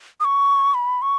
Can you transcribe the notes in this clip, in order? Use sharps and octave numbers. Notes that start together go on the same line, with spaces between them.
D#6
C#6
B5
C#6